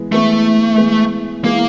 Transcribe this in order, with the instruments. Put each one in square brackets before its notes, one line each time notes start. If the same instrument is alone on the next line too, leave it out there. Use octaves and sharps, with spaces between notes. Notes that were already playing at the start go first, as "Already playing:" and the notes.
Already playing: [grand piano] E3 G#3 B3 E4
[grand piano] E3 G#3 B3 E4 [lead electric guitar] A3
[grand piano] E3 G#3 B3 E4
[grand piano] E3 G#3 B3 E4 [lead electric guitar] A#3